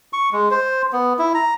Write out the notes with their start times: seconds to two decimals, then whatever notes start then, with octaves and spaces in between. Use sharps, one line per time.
0.13 C#6
0.32 G#3
0.51 C5
0.93 B3
1.19 E4
1.34 A#5